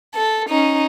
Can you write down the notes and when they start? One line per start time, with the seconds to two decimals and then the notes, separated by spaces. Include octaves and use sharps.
0.15 A4
0.50 C#4 D#4